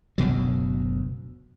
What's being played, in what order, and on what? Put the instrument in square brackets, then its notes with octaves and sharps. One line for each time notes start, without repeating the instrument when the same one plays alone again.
[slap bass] F#1 D2 B2 F#3